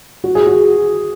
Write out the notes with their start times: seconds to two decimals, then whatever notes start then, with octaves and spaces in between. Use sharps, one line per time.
0.24 F#4
0.35 G#4
0.47 F#4